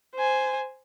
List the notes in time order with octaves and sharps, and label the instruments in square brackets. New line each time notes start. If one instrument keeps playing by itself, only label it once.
[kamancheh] C5 G#5